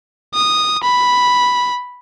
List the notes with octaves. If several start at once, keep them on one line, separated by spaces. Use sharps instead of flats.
D#6
B5